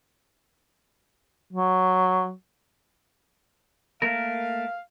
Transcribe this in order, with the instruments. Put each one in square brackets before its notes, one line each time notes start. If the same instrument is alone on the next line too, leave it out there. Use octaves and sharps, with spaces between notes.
[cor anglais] F#3
[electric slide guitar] A3 A#3 A#4 [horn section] F5